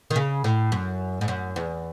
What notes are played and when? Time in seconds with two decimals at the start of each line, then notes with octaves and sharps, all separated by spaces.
0.10 D#3
0.16 C#3
0.44 A2
0.72 F#2
1.21 G#2
1.28 F#2
1.56 E2